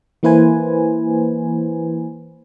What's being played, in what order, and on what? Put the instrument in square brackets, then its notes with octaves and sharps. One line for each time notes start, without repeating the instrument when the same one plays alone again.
[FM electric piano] E3 A#3 E4 B4 C5 G#5